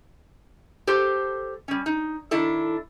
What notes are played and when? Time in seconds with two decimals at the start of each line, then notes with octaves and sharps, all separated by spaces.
0.87 G4 A4 C5
1.68 G3 C#4
1.86 D#4
2.31 D#3 D4 E4 A4